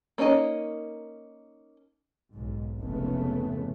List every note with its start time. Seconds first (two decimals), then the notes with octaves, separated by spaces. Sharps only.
0.18 A#3 C#4 D#4 A4 D#5
2.33 B1 G#2
2.80 F1 G#2 C#3 A3 B3